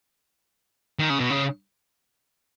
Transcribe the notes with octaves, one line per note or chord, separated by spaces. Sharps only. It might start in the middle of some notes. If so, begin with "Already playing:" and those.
D#3
C#3
B2
C#3